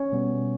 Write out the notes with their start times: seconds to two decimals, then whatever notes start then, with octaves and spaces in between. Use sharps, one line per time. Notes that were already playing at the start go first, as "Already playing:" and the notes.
Already playing: C#4 C#5
0.12 B2 G3 B3